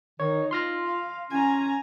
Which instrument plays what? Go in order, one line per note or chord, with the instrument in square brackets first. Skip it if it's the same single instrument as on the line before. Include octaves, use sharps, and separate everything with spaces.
[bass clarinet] D#3 [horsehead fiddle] D#4 [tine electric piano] C#5
[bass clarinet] F4 [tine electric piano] C6 F6 A#6
[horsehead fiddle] F5
[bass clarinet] C#4 [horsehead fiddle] G#5 A#5